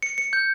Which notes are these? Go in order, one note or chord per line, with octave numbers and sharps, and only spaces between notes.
C#7
C#7
G6